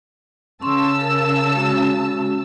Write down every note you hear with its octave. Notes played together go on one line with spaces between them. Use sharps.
C#3 C#4 A5 C6 C#6 E6
A#4
G#3 C#4 F#4